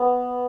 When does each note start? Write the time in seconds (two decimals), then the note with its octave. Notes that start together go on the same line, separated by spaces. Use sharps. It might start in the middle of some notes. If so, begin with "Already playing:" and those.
Already playing: B3